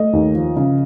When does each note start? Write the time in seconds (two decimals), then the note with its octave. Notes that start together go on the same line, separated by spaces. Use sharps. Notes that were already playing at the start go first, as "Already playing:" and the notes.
Already playing: A3 D#5
0.13 D#2
0.35 F3
0.57 C#3